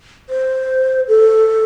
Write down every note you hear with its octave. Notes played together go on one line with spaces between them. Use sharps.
C5
A4